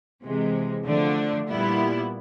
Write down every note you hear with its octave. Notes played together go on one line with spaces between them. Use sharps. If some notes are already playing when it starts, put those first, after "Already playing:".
C3 E3 G#3
D3 F3 A3 D4
A#2 G3 B3 E4